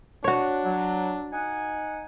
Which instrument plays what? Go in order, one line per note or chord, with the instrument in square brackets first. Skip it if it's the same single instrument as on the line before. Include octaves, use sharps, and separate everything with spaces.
[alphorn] D4 [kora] F#4 C#5
[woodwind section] F#3
D#4 F#5 G#5